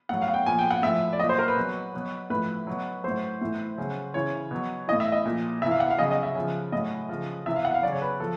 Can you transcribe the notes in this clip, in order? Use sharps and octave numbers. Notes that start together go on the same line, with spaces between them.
A2 F#3 F#5
F5
F#5
G5
A#2 F3 G#5
G5
F#5
A2 F3 E5
D5
A#2 F#3 D#5
C5
A#4
B4
B2 F#3
B2 F#3
A2 F3 B4
B2 F#3
A2 F#3 C5
A2 E3
C#3 F#3
C#3 E3 C#5
B2 F#3
A2 E3 D#5
E5
D#5
A#2 F3
C3 E3 E5
F5
F#5
F5
C#3 F#3 D#5
D#5
E5
C#3 F3
A2 F#3 D#5
C#3 F3
C3 E3 E5
F5
F#5
F5
C#3 F#3 D5
C#5
B4
F3 A4